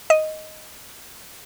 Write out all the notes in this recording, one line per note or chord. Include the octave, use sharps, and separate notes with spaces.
D#5